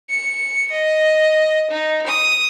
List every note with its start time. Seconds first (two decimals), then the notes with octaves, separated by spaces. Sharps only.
0.10 C#7
0.71 D#5
1.71 D#4
2.07 D#6